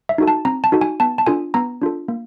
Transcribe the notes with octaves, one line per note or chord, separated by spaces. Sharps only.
E5
D#4 F#4 A4
A5
C4 A#5
A5
D#4 F#4 A4
G#5
B3 A5
A5
D4 F4 A4 G#5
B3 A#5
D4 F4 A4
A#3